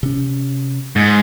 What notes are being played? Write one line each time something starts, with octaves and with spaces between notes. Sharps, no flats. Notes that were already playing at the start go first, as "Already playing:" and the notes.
C3 C#4
G#2